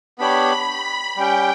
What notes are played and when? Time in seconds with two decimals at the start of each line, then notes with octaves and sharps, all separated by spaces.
0.18 B3 D4 G4 C#5 B5
1.16 G3 C#4 G4 G5